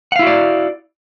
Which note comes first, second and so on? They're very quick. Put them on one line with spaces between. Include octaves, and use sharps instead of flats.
F#5 F5 E4 F#4 D5